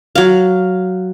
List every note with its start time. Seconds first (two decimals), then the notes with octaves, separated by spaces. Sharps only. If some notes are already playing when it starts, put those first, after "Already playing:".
0.15 F#3 F5